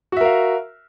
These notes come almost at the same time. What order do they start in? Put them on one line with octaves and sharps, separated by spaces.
F#4 E5 A#4 F5